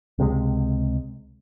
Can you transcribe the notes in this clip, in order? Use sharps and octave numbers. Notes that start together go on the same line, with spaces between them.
C#2 C3 E3 G#3